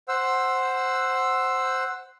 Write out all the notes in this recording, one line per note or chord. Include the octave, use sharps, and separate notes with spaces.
C5 F#5 E6